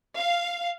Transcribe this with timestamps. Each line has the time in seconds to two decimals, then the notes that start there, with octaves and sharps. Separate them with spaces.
0.17 F5